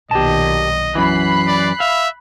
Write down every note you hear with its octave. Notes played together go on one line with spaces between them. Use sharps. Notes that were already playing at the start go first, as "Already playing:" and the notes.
B1 A#2 D#3 G4 D#5 A5
F#2 E3 B5 F#6 C7
D5
E5 F5